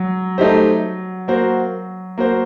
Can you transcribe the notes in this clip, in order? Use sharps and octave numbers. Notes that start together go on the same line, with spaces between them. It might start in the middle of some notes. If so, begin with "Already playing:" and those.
Already playing: F#3
A3 D#4 G4 C5
A#3 F#4 C5
A#3 F#4 C5